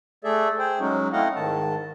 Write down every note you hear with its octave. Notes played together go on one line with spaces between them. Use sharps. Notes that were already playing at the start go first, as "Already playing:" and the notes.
A3 G#4 A4 D5 E5
G#4 C5 G5
F#3 G#3 C#4 D#4 F#4
A3 C4 E4 D#5 F5 F#5
G#2 D#3 A5